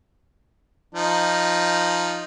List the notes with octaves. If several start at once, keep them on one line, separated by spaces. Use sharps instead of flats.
F3 D#4